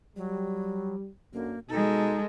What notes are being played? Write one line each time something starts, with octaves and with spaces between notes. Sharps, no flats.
F#3 G3
F#2 D3 A#3
B2 G#3 D#4 A4